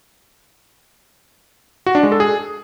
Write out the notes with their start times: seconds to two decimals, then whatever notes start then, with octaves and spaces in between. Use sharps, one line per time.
1.86 F#4
1.95 D4
2.03 G#3
2.12 A4
2.20 G#4